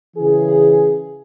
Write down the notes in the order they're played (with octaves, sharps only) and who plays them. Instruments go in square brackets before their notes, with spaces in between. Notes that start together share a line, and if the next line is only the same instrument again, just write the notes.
[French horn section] C#3 E3 G#4